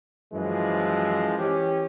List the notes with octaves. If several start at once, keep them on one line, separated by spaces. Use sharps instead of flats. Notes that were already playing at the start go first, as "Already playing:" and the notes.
F#2 E3 F3 G#3
E3 C#4 G4